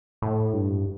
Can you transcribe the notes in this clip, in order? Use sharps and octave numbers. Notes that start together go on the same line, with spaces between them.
A2
G2